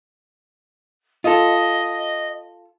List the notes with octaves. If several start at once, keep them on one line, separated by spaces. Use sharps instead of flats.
F4 A4 D#5